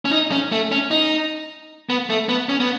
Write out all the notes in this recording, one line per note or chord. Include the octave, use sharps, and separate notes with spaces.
C#4
D#4
C#4
A3
C#4
D#4
B3
A3
B3
C#4
B3